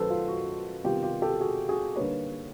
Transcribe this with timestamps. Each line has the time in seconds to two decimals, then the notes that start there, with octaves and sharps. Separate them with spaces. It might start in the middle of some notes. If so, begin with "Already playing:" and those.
Already playing: F#2 D#3 F#3 A3 A4 B4 C5
0.10 F4
0.28 F#4
0.84 C3 D#3 G3 B3 D#4 F4 G4
1.03 F4 G4
1.22 G4 A4
1.40 F#4 G#4
1.69 F#4 G#4
1.96 D3 G3 A#3 D#4 B4 C#5